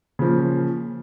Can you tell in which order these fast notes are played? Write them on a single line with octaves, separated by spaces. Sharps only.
C#3 F3 A#2